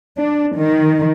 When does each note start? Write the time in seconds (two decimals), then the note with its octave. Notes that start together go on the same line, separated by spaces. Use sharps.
0.18 D4
0.56 D#3